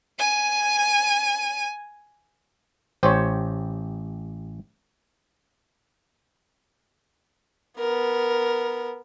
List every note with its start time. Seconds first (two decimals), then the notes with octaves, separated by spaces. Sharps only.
0.19 G#5 D#7
3.03 A1 G4 C5 C#5
7.79 B3 A#4